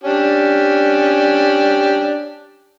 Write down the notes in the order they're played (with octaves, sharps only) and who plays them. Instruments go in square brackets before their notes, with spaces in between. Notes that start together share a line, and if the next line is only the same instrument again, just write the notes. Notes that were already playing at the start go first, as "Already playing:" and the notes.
[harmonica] C#4 D4 G4